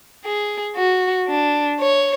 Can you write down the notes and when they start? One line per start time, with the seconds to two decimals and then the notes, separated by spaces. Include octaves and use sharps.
0.24 G#4
0.76 F#4
1.28 D4
1.80 C#5